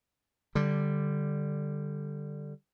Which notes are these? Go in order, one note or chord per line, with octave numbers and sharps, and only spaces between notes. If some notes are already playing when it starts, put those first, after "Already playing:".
D3 G3